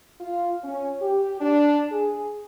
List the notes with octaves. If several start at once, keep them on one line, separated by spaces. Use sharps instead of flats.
F4
C#4
G4
D4
G#4